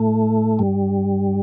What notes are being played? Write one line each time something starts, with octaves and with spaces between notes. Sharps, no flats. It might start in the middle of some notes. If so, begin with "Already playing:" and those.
Already playing: A2 A3
G2 G3